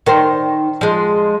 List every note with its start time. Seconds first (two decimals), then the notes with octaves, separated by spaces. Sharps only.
0.06 D#3 A#4 C5
0.81 F3 G#3